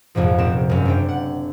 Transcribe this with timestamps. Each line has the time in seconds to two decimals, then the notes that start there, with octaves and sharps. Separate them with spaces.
0.15 A#1 F2 G#2 C3 F3
0.38 F1 A#1 C4 E7
0.69 G#1 F#2
0.85 F#1 C4 D4 G5
1.09 F#5